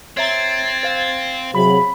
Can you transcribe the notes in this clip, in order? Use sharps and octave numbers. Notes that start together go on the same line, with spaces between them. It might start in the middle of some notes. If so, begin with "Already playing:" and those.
C4 C#5 E5 A#5 G#6 A6
C5 F5
C3 F#3 G#4 B5